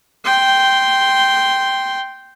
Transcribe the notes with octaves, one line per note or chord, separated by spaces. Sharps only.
G5 C6